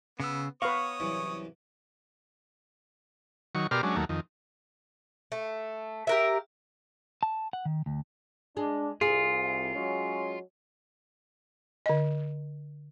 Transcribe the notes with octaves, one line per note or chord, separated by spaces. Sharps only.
C#3 B3 E6
B3 B4 C#5 F5 A#5 C#6 D#6
C2 F#2 E3
D#3 F#3 C#6
B2 G4 A#4 D5 C6 F6
F#3 G#3 C#4 D4
D#2 F#3 A3 A#3
F2 D#3
A3
G4 A#4 E5
A5
F#5
D#3
D2
G#3 D4
C2 F4 G#4
F#3 G#3 C#4
D3 D#5